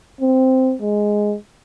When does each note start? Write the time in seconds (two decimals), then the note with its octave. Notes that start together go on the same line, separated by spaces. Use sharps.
0.21 C4
0.81 G#3